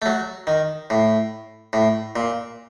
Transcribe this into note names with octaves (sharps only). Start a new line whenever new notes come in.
A3
F#3
D#3
A2
A2
A#2